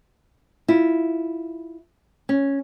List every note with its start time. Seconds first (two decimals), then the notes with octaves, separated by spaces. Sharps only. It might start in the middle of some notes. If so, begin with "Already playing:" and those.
0.68 E4 F4
2.29 C#4